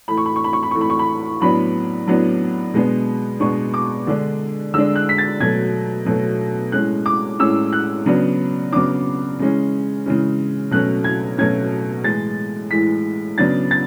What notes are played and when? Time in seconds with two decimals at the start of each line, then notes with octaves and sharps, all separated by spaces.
0.08 A2 E3 A3 B5
0.17 C#6
0.26 B5
0.36 C#6
0.44 B5
0.53 C#6
0.63 B5
0.71 A2 E3 A3 C#6
0.81 B5
0.90 C#6
0.99 B5
1.40 A2 F#3 B3 D4 B5
2.07 A2 F#3 B3 D4
2.74 B2 G#3 B3 D4
3.40 B2 G#3 B3 D4 C#6
3.74 D6
4.07 D3 G#3 D4
4.74 D3 G#3 D4 E6
4.95 F#6
5.09 B6
5.18 A6
5.40 B2 F#3 A3 G#6
6.06 B2 F#3 A3
6.72 A2 G#3 C#4 F#6
7.06 D6
7.39 A2 G#3 C#4 E6
7.73 F#6
8.06 C#3 F#3 B3 D4
8.72 C#3 F#3 B3 D4 D6
9.39 C#3 E3 G#3 C#4
10.06 C#3 E3 G#3 C#4
10.71 B2 F#3 A3 C#4 F#6
11.04 G#6
11.38 B2 F#3 A3 C#4 G#6
12.04 A2 E3 G#3 A6
12.71 A2 E3 G#3 B6
13.38 C#3 F#3 B3 D4 A6
13.71 A6